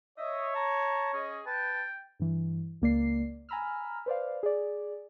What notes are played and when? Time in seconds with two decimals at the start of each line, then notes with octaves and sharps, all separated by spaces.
0.18 C#5 D#5 E5
0.55 A5 A#5
1.14 C#4 G#4 D#5
1.46 B4 G5 A5
2.20 G2 E3
2.82 C#2 A#3 D5 C7
3.49 G#5 A#5 B5 E6 F6
4.06 B4 C5 D5 F5
4.43 G#4 D5